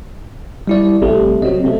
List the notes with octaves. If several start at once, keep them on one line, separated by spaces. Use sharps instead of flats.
G3 E4 D5
A1 C3 G3 A3
C3 F#3 D#5
C3 A3